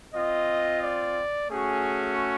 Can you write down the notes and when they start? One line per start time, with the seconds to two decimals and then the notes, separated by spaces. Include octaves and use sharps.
0.14 C4 F4 D#5
0.82 D5
1.51 A3 C#4 F#4 G#4